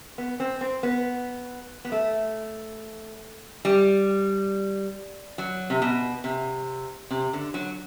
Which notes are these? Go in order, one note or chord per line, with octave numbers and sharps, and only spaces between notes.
B3
C4
C4
B3
B3
A3
G3
F#3
C3
B2
C3
C3
D3
F#3